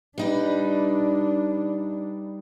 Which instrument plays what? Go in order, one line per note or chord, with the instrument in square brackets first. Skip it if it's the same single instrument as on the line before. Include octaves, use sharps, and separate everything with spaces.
[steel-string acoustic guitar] G3 D#4 B4 [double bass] D4